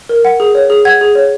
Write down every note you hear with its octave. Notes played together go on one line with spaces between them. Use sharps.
A#4
F#5
G#4
C#5
G#4
F#5 G#6
G#4
C#5